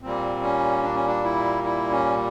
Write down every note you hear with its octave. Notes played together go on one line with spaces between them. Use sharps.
A#2 G3 A#3 C4
C#4
D4
C#4
D4
E4
E4
C#4